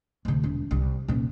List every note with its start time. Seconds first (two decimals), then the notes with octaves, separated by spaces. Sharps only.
0.25 D2 C3
0.44 E1
0.71 C2
1.08 D#1 C3